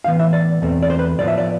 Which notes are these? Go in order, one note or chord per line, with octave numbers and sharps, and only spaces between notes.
A2 E3 B3 F5
E5
D5
E2 B2 A3 C4
D5
C5
B4
A2 F3 B3 D5
E5
D5